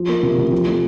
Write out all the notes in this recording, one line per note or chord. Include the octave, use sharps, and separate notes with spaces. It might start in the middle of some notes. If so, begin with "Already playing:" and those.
Already playing: F3
A#3
C3
C3
F3
A3